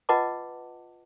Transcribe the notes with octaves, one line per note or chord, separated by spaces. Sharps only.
F4 B4 D#5 F#5 A5 D6